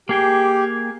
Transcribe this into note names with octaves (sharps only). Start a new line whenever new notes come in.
A#3 G4 G#4 G5